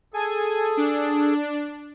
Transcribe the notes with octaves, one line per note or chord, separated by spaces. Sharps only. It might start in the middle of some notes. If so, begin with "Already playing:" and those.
G#4 A4 G#5
D4